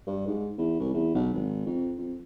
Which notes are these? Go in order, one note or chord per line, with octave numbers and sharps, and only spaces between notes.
G2
G#2
E2
C2
E2
B1
G#1
F2
F2